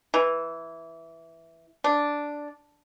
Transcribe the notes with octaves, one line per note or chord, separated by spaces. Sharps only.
E3
D4